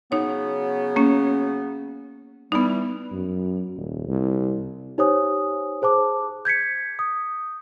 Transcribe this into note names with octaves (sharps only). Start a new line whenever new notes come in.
C#3 F#3 B3 D#4 C#5
A#3 C#4
E3 G3 B3 D#4
F#2
D#1
C2
D#4 G4 C5 C#5 G#5 D#6
G#4 C5 A5 D6
G6 G#6 B6 C#7
D#6